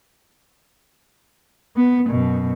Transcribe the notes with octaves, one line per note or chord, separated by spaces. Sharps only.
B3
F#2 B2